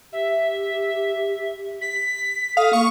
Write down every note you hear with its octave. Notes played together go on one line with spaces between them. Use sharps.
G4 E5
B6
A4 F5 D#6
A#3 C#6